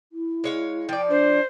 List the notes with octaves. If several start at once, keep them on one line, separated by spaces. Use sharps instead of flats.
E4
G#3 C#5 F5
F3 D5 G5
D4 C5